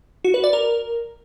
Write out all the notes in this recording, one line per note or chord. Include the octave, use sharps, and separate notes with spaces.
F#4
B4
D5
A#4